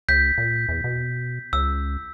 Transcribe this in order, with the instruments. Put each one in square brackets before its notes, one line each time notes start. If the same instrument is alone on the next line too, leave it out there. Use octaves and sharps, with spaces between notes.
[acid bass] C#2 [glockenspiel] G6 B6
[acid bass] A#2
E2
B2
[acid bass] C#2 [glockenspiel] E6